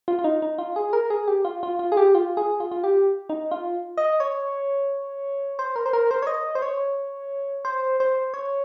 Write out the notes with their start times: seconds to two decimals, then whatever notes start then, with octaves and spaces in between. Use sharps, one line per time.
0.08 F4
0.19 F4
0.24 D#4
0.42 D#4
0.58 F4
0.76 G#4
0.93 A#4
1.10 G#4
1.28 G4
1.45 F4
1.63 F4
1.79 F4
1.92 G#4
1.97 G4
2.15 F4
2.37 G#4
2.60 F4
2.71 F4
2.84 G4
3.29 D#4
3.51 F4
3.98 D#5
4.20 C#5
5.59 C5
5.76 A#4
5.86 C5
5.93 A#4
6.11 C5
6.22 C#5
6.27 D#5
6.55 C5
6.62 C#5
7.65 C5
8.00 C5
8.34 C#5